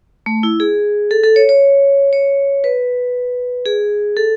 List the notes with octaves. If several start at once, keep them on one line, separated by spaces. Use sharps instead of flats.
A3
E4
G#4
A4
A4
C#5
C#5
C#5
B4
G#4
A4